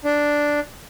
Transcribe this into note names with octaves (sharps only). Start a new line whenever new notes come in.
D4